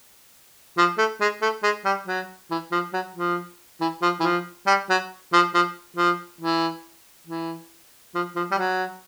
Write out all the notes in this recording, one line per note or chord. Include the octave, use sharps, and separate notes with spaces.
F3
A3
G#3
A3
G#3
G3
F#3
E3
F3
F#3
F3
E3
F3
E3
F3
G3
F#3
F3
F3
F3
E3
E3
F3
F3
G3
F#3